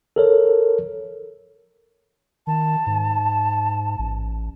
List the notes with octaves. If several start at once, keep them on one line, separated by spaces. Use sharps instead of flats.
A4 A#4 C#5
D#3 A5
G#2
A1